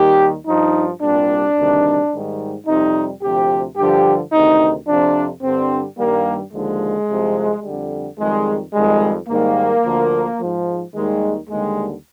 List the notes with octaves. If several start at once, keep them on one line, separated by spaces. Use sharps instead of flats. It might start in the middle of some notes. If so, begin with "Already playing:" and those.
Already playing: D#2 D#3 G3 G4
G2 F3 D#4
C2 A#2 G3 D4
D2 C3 D#3 G3
G#2 D#3 G3
F2 C3 G3 D#4
D2 C3 F3 G4
G2 D3 F3 G4
D2 C3 D#3 D#4
F2 C3 F3 D4
G2 D3 G3 C4
G2 D#3 G3 A#3
D#2 D3 F3 G#3
C2 C3 F3
F2 D3 G3
F2 D#3 G3 G#3
F2 D#3 G3 G#3
G#2 D#3 G3 A#3
D2 D3 F3
G#2 F3
D#2 D#3 G3 G#3
D#2 D3 G3 G#3